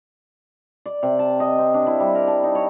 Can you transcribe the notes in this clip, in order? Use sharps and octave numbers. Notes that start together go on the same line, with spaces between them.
D5
C3
A5
D#5
C4
D4
E4
G3
A#4
A5
D#4
C#5